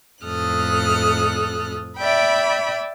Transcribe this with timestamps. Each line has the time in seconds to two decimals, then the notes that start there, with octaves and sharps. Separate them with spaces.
0.24 F2 A2 A4 D#6 F6 F#6
1.97 D5 E5 G5 B5